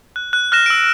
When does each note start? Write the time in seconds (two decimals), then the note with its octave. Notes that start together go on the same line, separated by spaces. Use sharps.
0.16 F#6
0.33 F#6
0.52 F6 F#6 A#6 E7
0.66 E6 D7